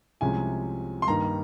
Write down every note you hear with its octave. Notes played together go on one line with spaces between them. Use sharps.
C2 C3 F3 G#3 C#4 G#5
C6
G2 D#3 A#3 D#4 A#5